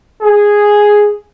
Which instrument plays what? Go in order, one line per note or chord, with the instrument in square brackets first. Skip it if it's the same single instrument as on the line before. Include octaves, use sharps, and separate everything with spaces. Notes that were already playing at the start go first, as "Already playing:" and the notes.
[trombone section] G#4